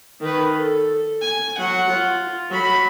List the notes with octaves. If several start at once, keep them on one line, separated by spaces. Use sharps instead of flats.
D#3 B4
A4
G#5
F#3 F#5
F4
F#3 B5